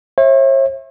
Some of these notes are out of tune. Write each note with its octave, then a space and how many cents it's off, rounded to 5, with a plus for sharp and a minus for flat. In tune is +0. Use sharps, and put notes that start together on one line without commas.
C#5 -45 E5 +0